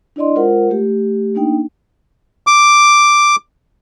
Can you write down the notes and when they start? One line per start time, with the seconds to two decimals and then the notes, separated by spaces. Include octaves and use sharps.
0.16 D4 E4 D5 D#5 C6
0.36 G#3 F4 A#4 C5 F#5
0.70 A3 G4
1.35 A#3 D4 D#4 G5
2.47 D6